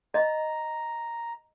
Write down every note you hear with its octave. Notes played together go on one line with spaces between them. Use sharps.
D#5 A#5